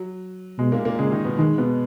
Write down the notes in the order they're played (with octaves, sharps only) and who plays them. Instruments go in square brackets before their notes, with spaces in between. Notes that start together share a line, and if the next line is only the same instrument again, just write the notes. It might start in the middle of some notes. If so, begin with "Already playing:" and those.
Already playing: [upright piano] F#3
[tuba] B2 [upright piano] G#3
[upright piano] A#2 A#3
A#2 A#3
[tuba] C#3 [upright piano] G#3 G#4
[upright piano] D#3 D#4
B2 B3
[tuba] D#3 [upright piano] G#3
[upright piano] B2 B3